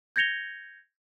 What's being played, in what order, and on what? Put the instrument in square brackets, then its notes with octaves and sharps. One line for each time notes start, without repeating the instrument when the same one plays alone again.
[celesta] G6 G#6 A#6 C#7 F7 G7